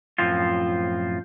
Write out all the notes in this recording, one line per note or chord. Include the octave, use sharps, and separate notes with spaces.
F#2 A2 F3 C4 F4